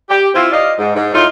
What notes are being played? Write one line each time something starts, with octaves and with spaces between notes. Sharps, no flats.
G4
C4 E4 F4
D5 D#5 F5
G#2
G#2
A2 D#4 F4